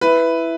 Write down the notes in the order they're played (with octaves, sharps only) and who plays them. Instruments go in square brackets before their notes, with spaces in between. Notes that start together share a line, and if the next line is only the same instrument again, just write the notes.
[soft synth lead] E4 [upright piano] B4